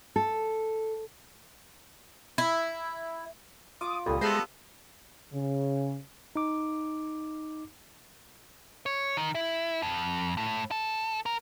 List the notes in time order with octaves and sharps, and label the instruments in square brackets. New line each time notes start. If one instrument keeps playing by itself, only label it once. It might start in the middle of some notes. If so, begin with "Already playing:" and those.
[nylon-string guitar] A4
[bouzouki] E4
[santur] F4 [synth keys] D6 [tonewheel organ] D#6
[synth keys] C#2 A#2 [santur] G3 D#6 [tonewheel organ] A4
[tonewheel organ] G#3 G#4 A#6 [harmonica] B3 A4 [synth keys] C5 E5 C6
[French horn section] C#3
[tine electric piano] D#4 D6
[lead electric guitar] C#5
D#3
E4
F2
A2
A4
A#4